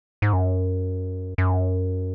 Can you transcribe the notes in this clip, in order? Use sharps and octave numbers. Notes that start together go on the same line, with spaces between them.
G#2
F#2
F#2